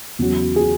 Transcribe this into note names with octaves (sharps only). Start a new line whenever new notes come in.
E2 C#3 F#3
G#4